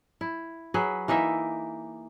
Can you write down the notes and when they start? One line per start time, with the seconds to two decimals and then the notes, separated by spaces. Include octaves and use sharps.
0.21 E4
0.74 F#3 G#4 B4
1.08 E3 A#3 D#4 E5